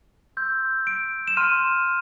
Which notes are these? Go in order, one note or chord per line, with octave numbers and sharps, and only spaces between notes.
C6 E6 G6
D7
E7
C6 F6 D#7